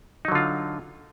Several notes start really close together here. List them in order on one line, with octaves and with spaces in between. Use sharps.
D#4 F#3 D3 F4